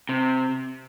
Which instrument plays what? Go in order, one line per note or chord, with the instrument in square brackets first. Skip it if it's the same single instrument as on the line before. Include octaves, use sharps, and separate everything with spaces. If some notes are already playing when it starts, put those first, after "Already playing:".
[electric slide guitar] C3